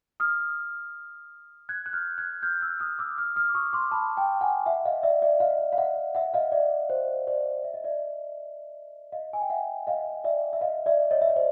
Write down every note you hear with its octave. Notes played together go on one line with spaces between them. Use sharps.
D#6 F6
F#6 G#6
F#6
F6 G6
F#6 G#6
F6 G6
E6 F#6
D#6 F6
D6 E6
D#6 F6
D#6 F6
D6
C#6 D#6
C6 D6
A5 B5
G5 A5
F#5 G#5
E5 F#5
D#5 F5
D5 E5
D5 E5
D#5 F5
F5
E5 F#5
E5 F#5
D#5 F5
D5 E5
C5
C5 D5
E5
D#5
D5 E5
D#5 F5
G#5
G5
E5 F#5
D#5 F5
D5 E5
E5
D#5 F5
D5 E5
C#5 D#5
E5
D#5
C5 D5